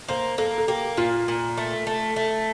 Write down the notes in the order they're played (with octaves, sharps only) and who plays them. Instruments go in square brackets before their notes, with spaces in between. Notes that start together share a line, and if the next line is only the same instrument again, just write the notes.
[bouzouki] A#3 [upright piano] C5
[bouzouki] A#3 [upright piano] A4
[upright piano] A4
[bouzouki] A#3 [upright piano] G4
[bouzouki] A#2 [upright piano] F4
[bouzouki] A#2
A3
A3
A3